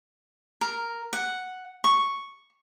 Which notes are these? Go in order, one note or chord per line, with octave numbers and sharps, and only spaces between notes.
A#4
F#5
C#6